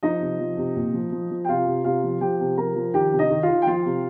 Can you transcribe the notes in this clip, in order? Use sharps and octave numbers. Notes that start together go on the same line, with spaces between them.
F3 D#4 D#5
C3
F3
C3
A#2
F3
F3
F3
G5
C3 F4 F5
C3
C3 F4 F5
F3
F3 G4 G5
C3
F3 A#4 A#5
F3
D#3 G4 G5
C3
D#4 D#5
D#3
F4 F5
D#3
G5
F3 F4 F5
C3